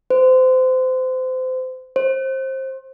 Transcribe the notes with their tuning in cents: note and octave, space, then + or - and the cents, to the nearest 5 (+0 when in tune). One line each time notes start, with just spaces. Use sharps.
C5 -30
C5 +20